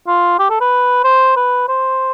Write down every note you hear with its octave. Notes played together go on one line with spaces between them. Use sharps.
F4
G4
A4
B4
C5
B4
C5